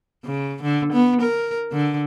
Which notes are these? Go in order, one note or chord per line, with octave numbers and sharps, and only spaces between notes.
C#3
D3
B3
A#4
D3